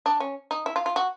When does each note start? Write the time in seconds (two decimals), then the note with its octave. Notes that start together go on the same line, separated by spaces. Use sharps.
0.06 D4
0.20 C#4
0.51 D#4
0.66 E4
0.76 F4
0.86 F4
0.96 F#4